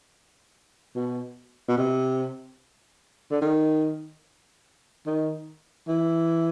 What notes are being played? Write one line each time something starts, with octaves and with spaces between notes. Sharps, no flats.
B2
B2
C3
D3
D#3
D#3
E3